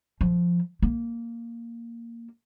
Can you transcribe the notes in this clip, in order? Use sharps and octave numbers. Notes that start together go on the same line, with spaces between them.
F3
A#3